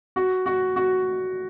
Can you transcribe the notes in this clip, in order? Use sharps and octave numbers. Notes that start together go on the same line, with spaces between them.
F#4
F#4
F#4